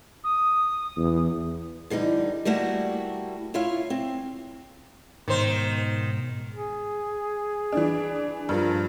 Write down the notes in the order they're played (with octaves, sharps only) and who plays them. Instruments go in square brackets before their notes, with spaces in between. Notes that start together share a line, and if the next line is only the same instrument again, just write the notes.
[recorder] D#6
[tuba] E2
[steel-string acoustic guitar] D3 E3 G3 D#4
G3 A3 A#3 E4 F#4
E4 F4 C#5 E5 F5
C4
[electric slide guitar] G#2 B2 [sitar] D#3 C5
[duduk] G#4
[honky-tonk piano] E3 D4
[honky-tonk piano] G2 F3 [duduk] A#4